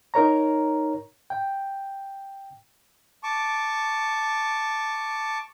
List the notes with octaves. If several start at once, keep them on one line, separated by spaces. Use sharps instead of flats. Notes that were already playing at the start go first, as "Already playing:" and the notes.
D#4 A#4 C#5 A#5
G5
A5 C#6 D6